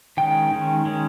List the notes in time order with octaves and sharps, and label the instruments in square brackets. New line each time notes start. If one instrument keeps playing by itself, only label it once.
[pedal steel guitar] D#3 G#3 C#4 G5
D#3 G#3 C#4
D#3 G#3 C#4